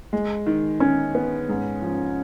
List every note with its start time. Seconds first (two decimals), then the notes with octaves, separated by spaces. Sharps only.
0.13 G#3
0.47 D#3
0.80 D#3 C#4
1.15 B3
1.49 G#2
1.82 F3